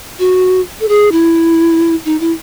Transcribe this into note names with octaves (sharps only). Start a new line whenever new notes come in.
F#4
A4
G#4
E4
D#4
E4